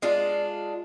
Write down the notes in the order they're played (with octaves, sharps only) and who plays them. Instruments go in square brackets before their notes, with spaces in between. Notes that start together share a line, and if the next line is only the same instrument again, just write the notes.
[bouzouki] G#3 D4 F4